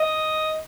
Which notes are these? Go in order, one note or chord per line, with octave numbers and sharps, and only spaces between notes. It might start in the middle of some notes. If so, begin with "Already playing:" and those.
Already playing: D#5